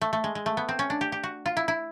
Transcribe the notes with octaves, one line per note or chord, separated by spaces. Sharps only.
A3
A3
G#3
G#3
A3
B3
C4
C#4
D4
G4
G4
F#4
F4
E4
E4